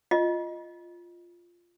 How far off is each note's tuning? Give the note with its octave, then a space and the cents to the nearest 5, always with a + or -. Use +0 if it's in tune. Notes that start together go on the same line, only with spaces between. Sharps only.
F4 +0 D#5 +0